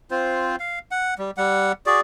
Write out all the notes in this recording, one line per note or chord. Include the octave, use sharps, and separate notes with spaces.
C4 F4 C5
F5
F#5
G3
G3 F#5
F#4 G#4 D5